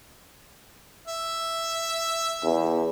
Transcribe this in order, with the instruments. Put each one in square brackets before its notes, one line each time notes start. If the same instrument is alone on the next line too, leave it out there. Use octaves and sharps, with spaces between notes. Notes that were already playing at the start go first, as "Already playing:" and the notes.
[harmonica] E5
[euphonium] E2